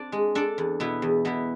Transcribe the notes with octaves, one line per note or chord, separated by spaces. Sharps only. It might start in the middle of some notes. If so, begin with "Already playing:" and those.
Already playing: C4 D4 D5
G#3
D4 A4 D5
E2
B2 B3 E4
E2
B2 B3 E4